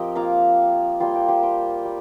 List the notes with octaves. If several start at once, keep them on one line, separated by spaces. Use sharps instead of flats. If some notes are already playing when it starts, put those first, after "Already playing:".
Already playing: F3 C4 G4 A#4 C5 D#5 G5
A#3 F4 F5 A#5
G3 A#3 F4 G5 C6
G5 C6
G4 C5
G5 C6
G3